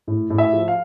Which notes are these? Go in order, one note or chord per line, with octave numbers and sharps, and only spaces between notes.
A2
A2
E5
F3
F5